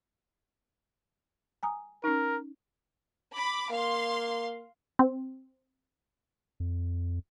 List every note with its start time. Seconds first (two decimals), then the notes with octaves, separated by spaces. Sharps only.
1.63 G#5 A#5 D#6
2.04 C#4 D#4 A#4
3.34 B5 D6
3.71 A#3 F5 C6
4.99 C4
6.60 F2